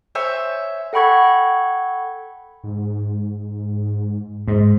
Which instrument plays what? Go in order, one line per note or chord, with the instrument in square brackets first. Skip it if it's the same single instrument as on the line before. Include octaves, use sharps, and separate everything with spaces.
[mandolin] C5 C#5 E5 G#5
[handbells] A4 F#5 G5 B5 C#6 G#6
[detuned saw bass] G#2
[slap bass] G#2